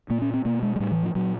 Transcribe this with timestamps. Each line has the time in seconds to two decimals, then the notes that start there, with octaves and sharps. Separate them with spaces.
0.10 A#2 A#3
0.22 C#4
0.34 C4
0.45 B2 A#3
0.63 G#3
0.76 G#3
0.80 A2 G3
0.92 E3
1.03 F3
1.15 A#2 F#3